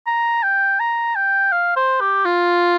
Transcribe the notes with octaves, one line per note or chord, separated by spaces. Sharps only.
A#5
G5
A#5
G5
F5
C5
G4
F4